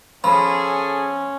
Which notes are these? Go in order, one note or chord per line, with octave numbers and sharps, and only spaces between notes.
F3 C#4 G#4 A4 B5